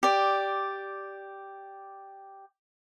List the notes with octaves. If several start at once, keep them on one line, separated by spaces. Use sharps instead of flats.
G4 D5